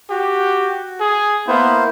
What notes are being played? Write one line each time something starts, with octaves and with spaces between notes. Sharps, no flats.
F#4 G4
G#4
A#3 B3 E4 C5